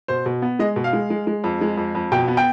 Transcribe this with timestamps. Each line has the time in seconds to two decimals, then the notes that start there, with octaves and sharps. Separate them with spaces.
0.08 B2 C5
0.26 B2
0.42 B3
0.59 G#3 D#5
0.76 B2
0.84 F5
0.93 G#3
1.10 G#3
1.27 G#3
1.44 F2
1.61 G#3
1.77 F2
1.95 F2
2.12 B2 G5
2.28 B3
2.37 G5